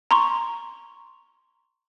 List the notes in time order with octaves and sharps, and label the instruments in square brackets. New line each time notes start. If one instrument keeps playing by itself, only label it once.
[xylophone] A#5 C6 C#6